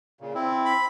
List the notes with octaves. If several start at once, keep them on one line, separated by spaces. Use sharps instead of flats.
A#2 C#3
C4 E4
B5